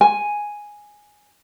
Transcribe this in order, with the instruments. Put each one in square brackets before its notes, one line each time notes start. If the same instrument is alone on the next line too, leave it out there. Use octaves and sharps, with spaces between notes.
[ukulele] G#5